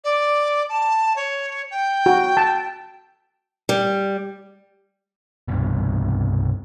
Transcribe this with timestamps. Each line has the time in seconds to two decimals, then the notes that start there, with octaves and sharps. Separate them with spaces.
0.04 D5
0.69 A5
1.15 C#5
1.70 G5
2.06 F#4
2.37 A5
3.69 G3
5.48 C2 G2 B2